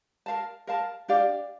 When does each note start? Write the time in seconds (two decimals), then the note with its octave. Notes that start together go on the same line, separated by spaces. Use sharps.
0.26 A#4 F5 A5
0.67 A#4 F5 A5
1.08 D4 G4 D5 F5